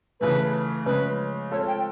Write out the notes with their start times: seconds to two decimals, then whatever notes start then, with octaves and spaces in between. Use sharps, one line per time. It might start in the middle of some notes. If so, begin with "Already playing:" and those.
0.20 C#3 E3 A3 B4
0.86 C#3 F3 G#3 C#4 B4
1.51 G#3 C4 F4 A4 C#5
1.67 G5